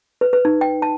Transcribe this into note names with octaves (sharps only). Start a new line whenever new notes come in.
B4
B4
D#4
G5
A5